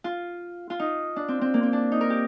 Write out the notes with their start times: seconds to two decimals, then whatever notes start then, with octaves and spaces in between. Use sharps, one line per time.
0.04 F4
0.70 F4
0.79 D#4
1.16 D4
1.28 C4
1.41 C4
1.54 A#3
1.63 C4
1.73 D4
1.92 D#4
2.01 A#4
2.10 G4